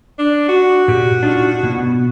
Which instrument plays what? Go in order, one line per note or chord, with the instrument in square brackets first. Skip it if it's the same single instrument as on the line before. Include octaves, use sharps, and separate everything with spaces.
[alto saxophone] D4
F#4
[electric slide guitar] A#2 G4
D4 D#4 F4
B2 B3